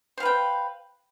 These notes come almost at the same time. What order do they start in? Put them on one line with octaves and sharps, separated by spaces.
C5 F5 B4 G5